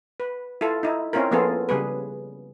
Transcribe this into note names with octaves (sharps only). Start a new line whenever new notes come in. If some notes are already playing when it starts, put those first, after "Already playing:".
B4
E4 F4 A4
D#4 E4
C4 C#4 E4 F4 A#4
F3 A#3 B3 F4 G#4 A4
C#3 G3 G#4 B4